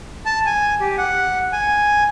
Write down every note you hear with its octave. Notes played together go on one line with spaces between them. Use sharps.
A5
G#5
G4
F#5
G#5